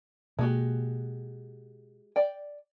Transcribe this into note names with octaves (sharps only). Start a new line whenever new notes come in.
B2 G#3 A#3 F#4 G4
D5 G5